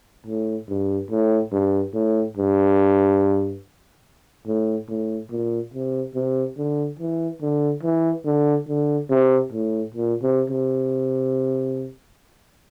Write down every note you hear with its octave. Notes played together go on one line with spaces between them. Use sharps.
A2
G2
A2
G2
A2
G2
A2
A2
A#2
C3
C3
D3
E3
D3
E3
D3
D3
C3
A2
A#2
C3
C3